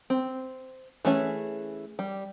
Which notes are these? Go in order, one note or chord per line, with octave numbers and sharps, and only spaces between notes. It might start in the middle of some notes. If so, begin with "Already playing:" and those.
C4
E3 A3 C#4 G#4
G3